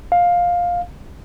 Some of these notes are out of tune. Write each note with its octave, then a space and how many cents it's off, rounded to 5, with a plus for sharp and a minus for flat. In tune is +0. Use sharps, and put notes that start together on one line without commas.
F5 +10